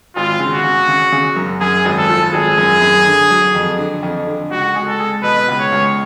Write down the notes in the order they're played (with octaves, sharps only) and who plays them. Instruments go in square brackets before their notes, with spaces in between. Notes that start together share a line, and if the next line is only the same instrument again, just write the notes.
[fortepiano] G#1 [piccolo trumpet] F4
[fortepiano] C#3
[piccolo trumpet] F#4
[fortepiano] C#3
C#3
C#3
F#2
[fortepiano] F#2 [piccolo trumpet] G#4
[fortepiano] G#1
[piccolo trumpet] A4
[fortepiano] F3
[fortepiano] G#1 [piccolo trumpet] G#4
[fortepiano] F#2
F#2
D3
F#3
F2
D3
F2
D3
[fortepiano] C#2 [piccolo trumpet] F#4
[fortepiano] G#3
[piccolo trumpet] A4
[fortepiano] G#3
[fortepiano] B2 [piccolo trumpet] B4
[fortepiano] C#2
[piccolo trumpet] C#5
[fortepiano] C#2